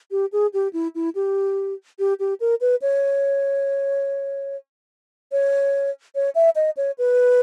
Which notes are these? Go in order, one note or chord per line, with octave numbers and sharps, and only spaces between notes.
G4
G#4
G4
E4
E4
G4
G4
G4
A#4
B4
C#5
C#5
C#5
E5
D#5
C#5
B4